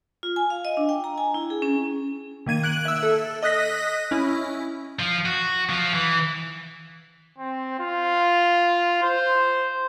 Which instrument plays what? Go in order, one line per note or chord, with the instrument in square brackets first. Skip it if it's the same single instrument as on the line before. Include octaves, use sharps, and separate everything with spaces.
[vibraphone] F4
G#5
F5
D#5
D4
G5
A#5
G#5
E4
G#4
C#4
[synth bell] D#3 A#3 G#6 D#7
F#6 D7 F#7
E5 E6
A4
D#5 D#6 F#6 A#6 B6
C#4 E4
[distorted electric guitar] F3
F#4
F3
E3
[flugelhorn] C4
F4
C5